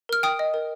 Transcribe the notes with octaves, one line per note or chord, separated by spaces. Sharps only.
A#4 F6
G5 D#6
D#5
A#4